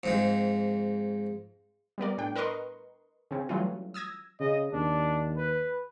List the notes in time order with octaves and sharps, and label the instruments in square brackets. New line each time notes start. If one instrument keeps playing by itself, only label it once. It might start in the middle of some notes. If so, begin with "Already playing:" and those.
[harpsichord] F2 G#2 G#3
[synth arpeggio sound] G3 B3 A#4 D5
A2 D4 G5
A#4 B4 D#5 C6 C#6
C#3 C4 C#4
E3 F#3 G3 A3 C#4 F4
D#6 E6 G#6 A#6
[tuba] C#3 [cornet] D#5
[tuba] D#2 [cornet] D4
[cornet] B4